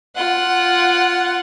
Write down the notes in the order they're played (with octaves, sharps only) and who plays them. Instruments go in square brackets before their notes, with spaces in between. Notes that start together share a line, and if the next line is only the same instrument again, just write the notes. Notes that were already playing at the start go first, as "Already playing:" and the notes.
[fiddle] F4 F#5